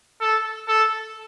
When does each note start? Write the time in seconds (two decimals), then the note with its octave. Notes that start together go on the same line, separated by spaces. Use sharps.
0.21 A4
0.68 A4